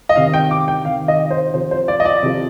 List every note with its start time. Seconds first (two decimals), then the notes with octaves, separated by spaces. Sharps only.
0.09 D#5
0.16 C3 D#3 F5
0.34 G5
0.51 D6
0.68 G5
0.85 C3 D#3 F5
1.08 D#5
1.30 C5
1.54 C3 F3 C5
1.71 C5
1.88 D5
2.00 D#5
2.05 D5
2.23 C3 F3